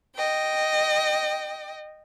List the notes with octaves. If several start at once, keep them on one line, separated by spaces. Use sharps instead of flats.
D#5 G5